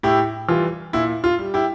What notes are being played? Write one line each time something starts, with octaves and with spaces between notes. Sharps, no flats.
A2 E4 G4
E3 G3 F4
A#2 E4
F4
G3
E4 G4